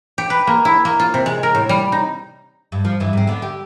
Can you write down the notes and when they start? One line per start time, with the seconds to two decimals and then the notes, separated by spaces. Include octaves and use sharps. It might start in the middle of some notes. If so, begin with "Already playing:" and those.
0.18 G4
0.30 B4
0.47 A#3
0.65 E4
0.85 A#3
1.00 F4
1.14 C3
1.26 G#3
1.43 A#4
1.55 A2
1.69 G3
1.92 D#4
2.72 G2
2.85 F3
3.00 G2 E3
3.13 G#2 C4
3.27 D3 B3
3.42 G4